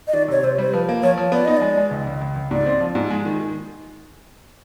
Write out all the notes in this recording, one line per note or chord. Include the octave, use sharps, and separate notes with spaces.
D#5
D#3 D5
C3 C#5
C3 C5
G3 C5
F3 B4
A#3
F3 C#5
F3
B3 D5
D#4 D#5
G#3 D5
G#3
C#2
C#2
C#2
C#2
G#2 D5
C4
F3
G#2
G#3
D#3
D#3